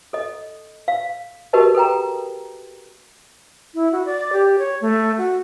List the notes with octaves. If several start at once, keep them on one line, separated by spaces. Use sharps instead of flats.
A4 D#5
F5
F#4 G4 A#4 B4 D#5 A5
A4 B4 G5 A#5
E4
F#4
D5
G4
C#5
A3
F#4